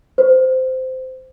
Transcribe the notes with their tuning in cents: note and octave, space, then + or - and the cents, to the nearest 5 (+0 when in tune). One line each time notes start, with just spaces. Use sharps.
C5 -15